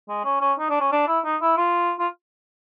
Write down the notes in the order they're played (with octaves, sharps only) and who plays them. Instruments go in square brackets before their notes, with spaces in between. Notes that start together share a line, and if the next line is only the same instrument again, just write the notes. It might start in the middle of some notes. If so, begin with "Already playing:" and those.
[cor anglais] G#3
C#4
C#4
D#4
D4
C#4
D4
E4
D#4
E4
F4
F4